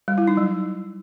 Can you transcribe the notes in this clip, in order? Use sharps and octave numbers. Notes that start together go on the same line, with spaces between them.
G3
E4
D#4
F#3